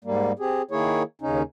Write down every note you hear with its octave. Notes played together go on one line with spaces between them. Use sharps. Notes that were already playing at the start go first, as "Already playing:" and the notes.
G#2 G3 A#3
C4 G4 G#4
D#3 A#3 E4 G#4 C#5
D#2 C#3 C#4 D#4